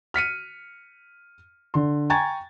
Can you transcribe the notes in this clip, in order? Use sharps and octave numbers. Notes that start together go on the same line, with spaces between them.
F6 B6 C#7 D#7
D3 C6
G5 G#5 A#5 C#6 G#6 A6